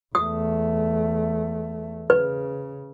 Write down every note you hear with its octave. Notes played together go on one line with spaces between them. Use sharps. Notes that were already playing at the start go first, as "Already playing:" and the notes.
E2 A3 D#6
C#3 B4